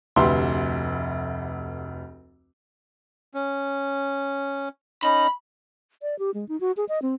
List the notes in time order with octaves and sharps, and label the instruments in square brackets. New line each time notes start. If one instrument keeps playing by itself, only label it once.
[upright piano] F1 D2 G4 B4 E5 C6
[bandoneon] C#4
[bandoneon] C#4 D#4 A#5 [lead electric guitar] B5
[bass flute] D5
G4
G#3
D#4
F#4
G#4
D#5
C4